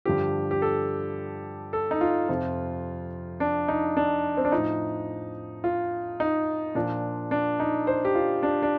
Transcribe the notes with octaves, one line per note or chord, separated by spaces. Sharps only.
G2 D3 F3 G4
G4
A4
A4
D#4
F4
F2 C3 F3
D4
D#4
D4
C4
D4
A2 F3 D#4
F4
D#4
A#2 F3 D4
D4
D#4
C5
G4
F4
D4
D4